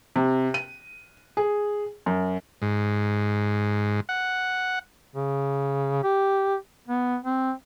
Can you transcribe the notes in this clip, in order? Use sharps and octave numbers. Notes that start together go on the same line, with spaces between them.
C3
D#7
G#4
F#2
G#2
F#5
C#3
G4
B3
C4